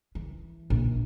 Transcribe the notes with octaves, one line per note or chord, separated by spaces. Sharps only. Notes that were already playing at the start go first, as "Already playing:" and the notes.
E3
A#1